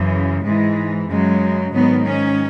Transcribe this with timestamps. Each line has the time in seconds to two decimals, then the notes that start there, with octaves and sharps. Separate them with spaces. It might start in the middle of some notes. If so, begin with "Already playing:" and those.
Already playing: F#2 C#3 E3
0.43 G#2 E3 G#3
1.08 F#2 C#3 F#3 G#3
1.73 G#2 D#3 F#3 B3
2.05 C#4